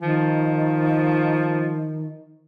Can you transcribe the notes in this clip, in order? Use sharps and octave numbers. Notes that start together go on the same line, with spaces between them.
D#3 F3